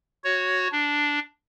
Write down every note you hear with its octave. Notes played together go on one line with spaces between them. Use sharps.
F#4 C#5
D4